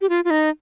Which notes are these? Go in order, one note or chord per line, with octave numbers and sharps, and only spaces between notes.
G4
F4
F4
D#4